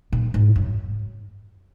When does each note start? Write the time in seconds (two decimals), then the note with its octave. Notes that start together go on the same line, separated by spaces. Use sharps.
0.12 A#2
0.34 G#2
0.56 F#2